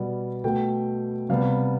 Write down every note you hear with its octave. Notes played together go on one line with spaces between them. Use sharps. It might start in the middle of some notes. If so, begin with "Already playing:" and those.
Already playing: B2 G3 B3 D5
B2 A3 G5
C3 G3 B3 F5